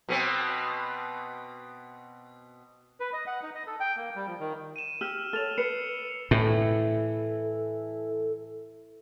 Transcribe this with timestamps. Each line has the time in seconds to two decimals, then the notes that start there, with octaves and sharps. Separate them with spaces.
0.09 B2 B3 C4
3.00 B4
3.13 D#5
3.27 F#5
3.43 D#4
3.55 D#5
3.67 A4
3.80 G5
3.97 A#3
4.15 G3
4.27 F3
4.40 D#3
4.76 D#7 E7
5.01 G4 E6 F6
5.33 A4 C#5 F6 F7
5.58 B4 C7 C#7 F7
6.31 A2 E3 A4